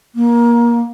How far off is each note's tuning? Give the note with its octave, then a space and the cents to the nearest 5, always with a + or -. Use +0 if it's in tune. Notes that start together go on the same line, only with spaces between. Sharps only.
A#3 +20